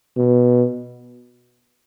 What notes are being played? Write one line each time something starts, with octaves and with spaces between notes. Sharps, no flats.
B2